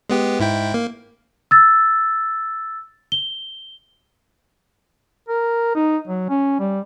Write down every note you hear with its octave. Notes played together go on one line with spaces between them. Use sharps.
G#3 B3 G4
G#2 E4 G5
A#3
E6 A6
G7
A#4
D#4
F#3
C#4
G3